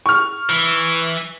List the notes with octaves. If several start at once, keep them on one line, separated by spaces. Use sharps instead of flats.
C#6 F6
E3